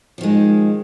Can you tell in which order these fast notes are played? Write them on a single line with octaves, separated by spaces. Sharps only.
F3 D#3 G#3